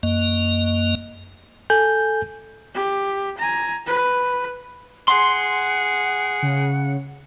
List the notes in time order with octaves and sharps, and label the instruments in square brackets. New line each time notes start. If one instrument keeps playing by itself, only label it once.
[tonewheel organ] F#2 A#3 D#5
[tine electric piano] A4 G#5 G6
[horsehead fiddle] G4
G#5 A#5
B4
[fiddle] G#4 [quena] F#5 [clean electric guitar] C6
[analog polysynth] C#3